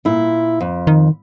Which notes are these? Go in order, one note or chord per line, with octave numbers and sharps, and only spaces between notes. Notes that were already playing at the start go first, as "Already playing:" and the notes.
A#2 E4
F2
D#3